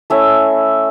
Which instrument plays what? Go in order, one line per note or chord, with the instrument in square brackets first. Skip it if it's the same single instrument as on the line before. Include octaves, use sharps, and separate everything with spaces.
[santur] A3 C#4 E4 E5